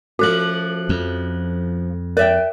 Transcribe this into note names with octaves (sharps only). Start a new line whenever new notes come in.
F3 A3 C#4 F#4 F#6 F#7
F2
A#4 D5 E5 G5